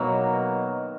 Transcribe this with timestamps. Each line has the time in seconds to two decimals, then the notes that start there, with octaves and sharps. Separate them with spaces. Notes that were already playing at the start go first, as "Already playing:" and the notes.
Already playing: B2 D#3 F#3 A#3